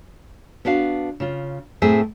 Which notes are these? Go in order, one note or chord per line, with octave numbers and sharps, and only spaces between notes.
B3 D4 F#4 F5
C#3 F4
A2 A3 C4 G#4 A#4 E5